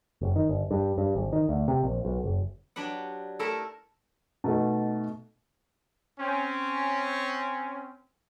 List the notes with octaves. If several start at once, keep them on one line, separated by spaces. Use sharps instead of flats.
F#1
D#3
G1
G2
G2
G#1
D#3
D2
C3
A#1
B1
F#1
F#3 D4 G4 B4 F#5
A3 E4 A4 A#4 E5
B2 A3 D#4
C4 C#4